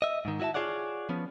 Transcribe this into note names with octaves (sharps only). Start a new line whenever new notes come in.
D#5 E5
G#2 D#3
E4 F#4 D#5 E5 A5
F4 F#4 G#4 C#5 D5 F#5
F3 B3 C#4